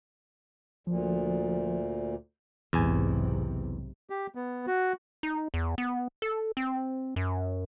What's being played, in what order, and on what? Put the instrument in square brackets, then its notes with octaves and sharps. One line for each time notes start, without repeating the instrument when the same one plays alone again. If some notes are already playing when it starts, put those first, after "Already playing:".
[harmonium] D2 A#2 [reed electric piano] F3
[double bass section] B1 G#2 C3 [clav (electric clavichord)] E2 G#5
[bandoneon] G4
B3
F#4
[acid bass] D#4
E2
B3
A4
C4
F#2